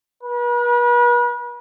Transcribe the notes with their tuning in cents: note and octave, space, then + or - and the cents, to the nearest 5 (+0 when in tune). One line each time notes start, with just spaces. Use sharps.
B4 -40